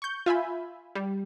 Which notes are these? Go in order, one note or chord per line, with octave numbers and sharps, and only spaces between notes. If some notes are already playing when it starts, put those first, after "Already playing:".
C#6 G6
F4 E5 G#5 B5
G3